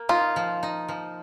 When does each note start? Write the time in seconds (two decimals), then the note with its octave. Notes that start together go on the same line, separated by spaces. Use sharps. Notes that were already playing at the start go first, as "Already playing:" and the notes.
Already playing: A#3
0.09 D#4 F4
0.36 F3
0.63 D#4
0.89 F3